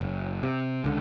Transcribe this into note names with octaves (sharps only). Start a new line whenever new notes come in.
F#1
C3
C#2 D3